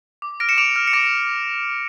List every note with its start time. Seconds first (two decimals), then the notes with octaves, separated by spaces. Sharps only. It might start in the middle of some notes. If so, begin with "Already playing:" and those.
0.22 D6
0.40 F6 A#6 D7
0.49 C#7 E7
0.57 D6 D7 F7
0.76 F6
0.87 C#7
0.93 D6 A#6 D7